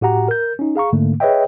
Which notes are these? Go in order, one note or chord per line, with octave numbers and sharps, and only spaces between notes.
A2 F#4 G4 F#5 A#5
A#4 G6
C#4 D#4
G#4 F5 A#5 C#6
G#2 D3 A3 A#3
G#4 B4 C#5 D#5 E5 G5